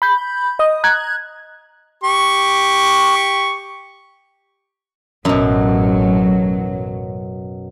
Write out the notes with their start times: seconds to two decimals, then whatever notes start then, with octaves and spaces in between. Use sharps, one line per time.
0.02 B5 G6
0.59 D#5 D#6
0.84 A#5 F#6 G#6
2.04 G4 C#6
5.25 A1 F#2 B2 F#3